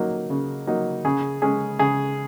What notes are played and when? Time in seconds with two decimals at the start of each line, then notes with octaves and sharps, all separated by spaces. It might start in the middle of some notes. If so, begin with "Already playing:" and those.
Already playing: F#3 A#3 D#4
0.30 C#3
0.67 F#3 A#3 D#4
1.05 C#3 G#4
1.42 G#3 C#4 G#4
1.79 C#3 G#4